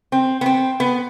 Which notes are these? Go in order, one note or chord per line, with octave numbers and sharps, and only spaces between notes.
C4
B3
C4
B3